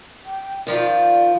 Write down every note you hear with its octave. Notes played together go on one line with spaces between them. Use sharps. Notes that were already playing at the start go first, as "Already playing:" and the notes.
G5
D#3 F3 F4 D5